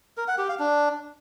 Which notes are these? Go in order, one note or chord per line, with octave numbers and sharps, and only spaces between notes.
A#4
F#5
G4
F5
D4